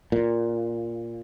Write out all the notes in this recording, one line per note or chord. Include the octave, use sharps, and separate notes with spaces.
A#2